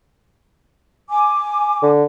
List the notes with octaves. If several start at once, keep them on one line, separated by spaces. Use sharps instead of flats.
G#5 D6
D3